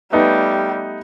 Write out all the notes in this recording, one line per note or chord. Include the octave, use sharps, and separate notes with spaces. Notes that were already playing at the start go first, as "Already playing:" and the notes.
G3 A3 B3 D#4